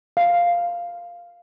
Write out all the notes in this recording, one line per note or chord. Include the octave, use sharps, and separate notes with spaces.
F5